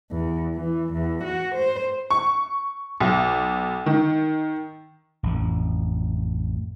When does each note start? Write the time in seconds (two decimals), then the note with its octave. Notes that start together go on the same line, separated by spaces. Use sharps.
0.11 E2
0.56 E3
0.93 E2
1.24 F#4
1.55 C5
2.10 C#6
3.00 B1
3.86 D#3
5.23 A1 F2